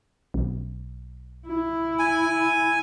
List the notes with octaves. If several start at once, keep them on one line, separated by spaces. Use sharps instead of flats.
B1
E4
G#5